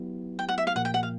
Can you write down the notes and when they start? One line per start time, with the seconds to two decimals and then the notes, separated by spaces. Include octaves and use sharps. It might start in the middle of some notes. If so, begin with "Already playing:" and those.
Already playing: F#3 B3 E4 G4
0.39 G5
0.49 F#5
0.58 E5
0.67 F5
0.76 A#2 F3 A#3 F#5
0.85 G5
0.94 F#5
1.03 F5